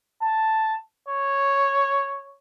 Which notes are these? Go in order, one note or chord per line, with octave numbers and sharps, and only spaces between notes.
A5
C#5